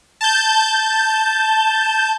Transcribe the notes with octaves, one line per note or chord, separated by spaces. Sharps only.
A5 G6